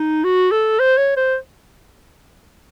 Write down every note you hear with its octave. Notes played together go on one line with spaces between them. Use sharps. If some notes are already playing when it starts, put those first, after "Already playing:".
Already playing: D#4
F#4
A4
C5
C#5
C5